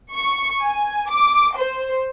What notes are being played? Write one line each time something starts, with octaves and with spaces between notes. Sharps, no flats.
C#6
G#5
D6
C5